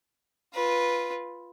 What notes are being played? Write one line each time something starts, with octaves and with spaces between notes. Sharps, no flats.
F4 B4